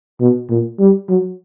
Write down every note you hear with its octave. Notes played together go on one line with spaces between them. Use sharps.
B2
A#2
G3
F#3